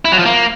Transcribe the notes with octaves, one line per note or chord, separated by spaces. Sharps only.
E4
F#3
F3
A#3